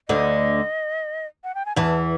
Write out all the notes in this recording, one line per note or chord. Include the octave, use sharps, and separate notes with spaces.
D2 D3 D#5
F#5
G5
G#5
E2 E3 A5